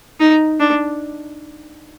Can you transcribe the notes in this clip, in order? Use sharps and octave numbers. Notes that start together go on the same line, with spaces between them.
D#4
D4